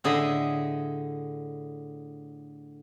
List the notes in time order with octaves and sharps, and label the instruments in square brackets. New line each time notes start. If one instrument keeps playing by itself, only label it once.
[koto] A2 D3 G#4 D#5 E5